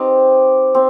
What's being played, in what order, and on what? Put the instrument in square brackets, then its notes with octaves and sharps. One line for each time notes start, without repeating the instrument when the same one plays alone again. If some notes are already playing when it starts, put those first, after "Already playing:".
Already playing: [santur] C4 D#4 G4 B4
C4